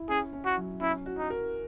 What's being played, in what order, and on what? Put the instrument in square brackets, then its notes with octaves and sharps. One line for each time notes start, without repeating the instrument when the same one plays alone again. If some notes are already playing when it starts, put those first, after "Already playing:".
Already playing: [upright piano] E4
[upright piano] C#4 [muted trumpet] G#4
[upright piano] C#4
[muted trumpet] F#4
[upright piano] F#3
[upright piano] C#4 [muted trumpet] E4
[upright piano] F#4
[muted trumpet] D#4
[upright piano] A#4